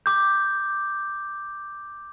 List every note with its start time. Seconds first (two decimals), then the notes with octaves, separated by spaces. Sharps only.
0.06 D6 G6